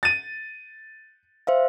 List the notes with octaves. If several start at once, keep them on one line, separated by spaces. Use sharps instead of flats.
A6 D#7
C5 E5 F5